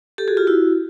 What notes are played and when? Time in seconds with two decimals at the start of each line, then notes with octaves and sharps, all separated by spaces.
0.18 G4 A4
0.28 F#4 G#4
0.37 F4 G4
0.47 E4 F#4